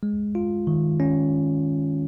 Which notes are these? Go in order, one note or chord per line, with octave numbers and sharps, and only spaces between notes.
G#3
F4
D#3
C#4